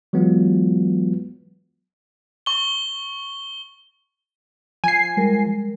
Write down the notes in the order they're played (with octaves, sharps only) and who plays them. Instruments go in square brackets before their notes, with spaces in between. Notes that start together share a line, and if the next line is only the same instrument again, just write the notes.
[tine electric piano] E3 F#3 G#3 B3 F4
[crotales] C#6 G7
[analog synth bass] F3 [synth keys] G#5 C7
[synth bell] G3 G#3 A#4